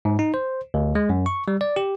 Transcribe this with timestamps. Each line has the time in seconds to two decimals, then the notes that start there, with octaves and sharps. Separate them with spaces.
0.05 G#2
0.19 D#4
0.34 C5
0.74 D2
0.95 G#3
1.09 F#2
1.26 C#6
1.48 G3
1.61 D5
1.76 G4